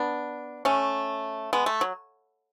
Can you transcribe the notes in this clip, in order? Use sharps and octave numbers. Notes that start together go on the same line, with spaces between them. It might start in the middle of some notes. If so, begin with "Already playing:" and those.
Already playing: B3 D4
A3 C#4
G#3 B3
A3
F#3